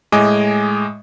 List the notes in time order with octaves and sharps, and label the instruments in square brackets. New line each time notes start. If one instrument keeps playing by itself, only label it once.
[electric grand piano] A2 G#3 D#5 G#5 D6